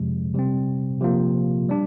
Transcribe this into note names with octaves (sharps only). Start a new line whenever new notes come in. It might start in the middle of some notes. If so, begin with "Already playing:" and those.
Already playing: F2 C3 F3 G#3
C3 G3 C4
C3 F3 A#3 F4
G3 D4